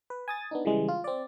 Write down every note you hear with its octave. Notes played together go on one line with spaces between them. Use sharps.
B4
G#5 D#6 A6
B3 D4 D#4
C#3 E3 G3 G#3
F4
C4 D5